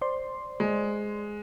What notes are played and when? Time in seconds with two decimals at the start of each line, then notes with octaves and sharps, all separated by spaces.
0.01 C5 D5 C6
0.60 G#3